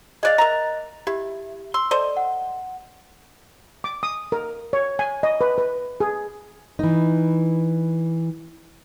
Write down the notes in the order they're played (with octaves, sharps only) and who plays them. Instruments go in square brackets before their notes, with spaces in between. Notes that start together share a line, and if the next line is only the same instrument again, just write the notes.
[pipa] G#4 D5 F5 [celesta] D#5 F#6 A6
[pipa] A#4 E5 A#5
[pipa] E4 [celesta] G4
[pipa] C6 [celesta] E6
[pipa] A4 C5 D#5 [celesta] D5
[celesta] F#5
[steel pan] D6
D#6
A#4
C#5
G#5
D#5
B4
B4
G#4
[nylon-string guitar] E3 D#4